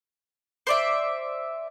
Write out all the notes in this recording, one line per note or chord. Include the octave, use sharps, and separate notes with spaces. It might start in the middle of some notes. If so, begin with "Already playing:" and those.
C5 D5 E5